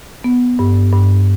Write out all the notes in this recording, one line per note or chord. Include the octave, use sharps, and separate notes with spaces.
B3
G2
G2